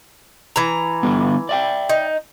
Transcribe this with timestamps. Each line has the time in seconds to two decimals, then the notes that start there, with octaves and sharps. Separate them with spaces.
0.56 E3 A#5
1.03 D3 G3 B3
1.49 D5 E5 G5
1.89 D#4